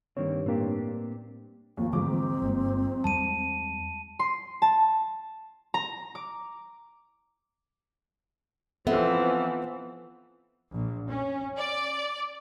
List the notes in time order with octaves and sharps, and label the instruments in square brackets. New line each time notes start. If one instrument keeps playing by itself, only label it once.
[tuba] G2 [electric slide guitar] D#3 A#3 C4 [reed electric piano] C#5
[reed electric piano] A2 A#3 [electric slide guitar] C4 D4 G4
[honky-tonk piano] D#2 [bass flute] F3
[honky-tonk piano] G#2 F3 D6 [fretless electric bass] D3 E3 A#3 [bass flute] C4
[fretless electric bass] G1 G3 A#3
[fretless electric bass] E2 G3 G#3 [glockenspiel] A5 D#7
[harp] C6
A5
A#5
D6
[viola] E3 C4 [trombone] F3 [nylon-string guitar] B3 [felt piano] A4 B4 E5
[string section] A#1
C#4
D5